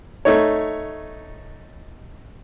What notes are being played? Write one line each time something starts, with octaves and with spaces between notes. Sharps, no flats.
A3 D#4 C#5